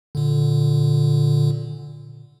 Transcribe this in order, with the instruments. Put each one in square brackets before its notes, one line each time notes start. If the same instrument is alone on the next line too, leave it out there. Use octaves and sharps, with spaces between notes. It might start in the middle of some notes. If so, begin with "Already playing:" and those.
[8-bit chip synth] A#2 D3